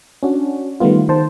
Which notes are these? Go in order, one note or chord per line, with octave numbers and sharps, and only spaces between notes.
C#4 D4 F#4
D#3 G3 A3 B3 F4
D#3 C5 A5